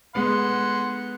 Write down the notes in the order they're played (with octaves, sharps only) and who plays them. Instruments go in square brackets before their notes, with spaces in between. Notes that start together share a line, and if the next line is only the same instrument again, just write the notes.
[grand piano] G#3 B3 [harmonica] F#5 C6